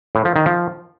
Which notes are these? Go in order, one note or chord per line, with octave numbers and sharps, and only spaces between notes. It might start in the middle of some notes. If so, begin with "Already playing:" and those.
A2
F3
D#3
F3